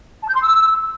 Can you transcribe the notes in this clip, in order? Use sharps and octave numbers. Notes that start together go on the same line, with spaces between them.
A5
G6
C6
E6